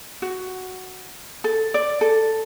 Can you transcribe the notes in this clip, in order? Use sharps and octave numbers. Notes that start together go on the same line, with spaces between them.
F#4
A4
D5
A4